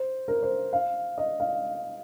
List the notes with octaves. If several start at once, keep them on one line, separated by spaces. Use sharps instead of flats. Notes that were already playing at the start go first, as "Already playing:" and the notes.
Already playing: C5
A#4
C5
F5
D#5
F5